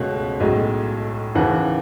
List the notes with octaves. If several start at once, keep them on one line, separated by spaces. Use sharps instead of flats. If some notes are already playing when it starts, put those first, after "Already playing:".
Already playing: C#2 B2 A3 C#4 F#5
B1 A2 G#3
D#2 C#3 E3 F#5